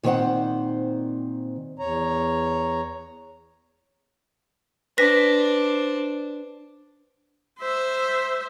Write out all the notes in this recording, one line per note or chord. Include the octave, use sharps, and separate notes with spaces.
A#2 D#3 C4 C5 F#5
E2 C#5 A#5
D4 B4 C5 A#6 B6
C5 E5